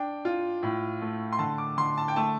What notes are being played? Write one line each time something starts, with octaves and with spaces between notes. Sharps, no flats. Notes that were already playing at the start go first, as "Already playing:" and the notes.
Already playing: D4 G5
F4
A2
A3
C6
D3 A5
D6
D3 C6
A5
G5
A3 A5